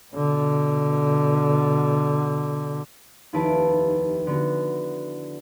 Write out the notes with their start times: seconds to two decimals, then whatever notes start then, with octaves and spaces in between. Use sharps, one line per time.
0.13 B2 D3
3.33 F1 D#2 E4 B4 A5 D7
4.27 D3 B3 F#4